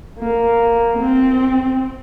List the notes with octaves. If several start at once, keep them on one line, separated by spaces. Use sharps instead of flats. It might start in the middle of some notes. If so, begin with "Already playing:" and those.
A#3
C4